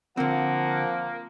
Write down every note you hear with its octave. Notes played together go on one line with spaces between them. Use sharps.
D3 F3 A#3 C4 F#5